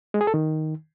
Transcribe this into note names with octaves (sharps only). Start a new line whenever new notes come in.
G#3
G#4
A4
D#3